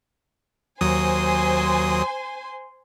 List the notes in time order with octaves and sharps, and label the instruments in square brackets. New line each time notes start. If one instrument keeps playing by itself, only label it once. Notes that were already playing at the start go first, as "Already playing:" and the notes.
[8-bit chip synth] D#2 F#3 D#6 [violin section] C5 G#5 C6